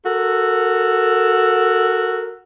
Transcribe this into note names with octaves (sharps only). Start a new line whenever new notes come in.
F#4 A4 A#4